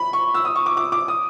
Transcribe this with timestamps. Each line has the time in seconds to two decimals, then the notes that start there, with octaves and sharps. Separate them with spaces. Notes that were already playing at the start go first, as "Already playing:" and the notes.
Already playing: B5
0.13 C#6
0.34 E6
0.45 D#6
0.55 C#6
0.66 D6
0.77 D6
0.92 D6
1.08 D#6